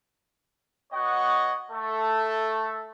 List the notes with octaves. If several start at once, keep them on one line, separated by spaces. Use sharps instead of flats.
B3 F#4 C#5 D#5 F#5 C#6
A3 A4